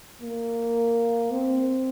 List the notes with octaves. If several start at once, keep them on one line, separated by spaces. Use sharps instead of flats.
A#3
C4